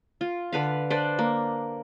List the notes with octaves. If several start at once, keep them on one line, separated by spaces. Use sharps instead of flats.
F4
D3 B4 F5
D4 B4 C5 D5
A#3